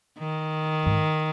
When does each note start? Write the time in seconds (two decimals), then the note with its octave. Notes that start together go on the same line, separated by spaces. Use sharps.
0.19 D#3
0.86 G#2